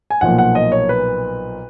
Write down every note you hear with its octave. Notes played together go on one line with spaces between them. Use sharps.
G#5
B1 A#2 F3 A#3 F#5
F#5
D#5
C#5
B4